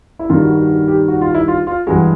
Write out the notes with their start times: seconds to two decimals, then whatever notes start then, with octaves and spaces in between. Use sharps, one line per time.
0.19 E4
0.29 G2 D#3 G3 F4
0.42 F#4
0.55 F#4
0.69 F#4
0.88 G4
1.08 F#4
1.21 F4
1.35 E4
1.48 F4
1.67 F4
1.87 G2 E3 G#3 F#4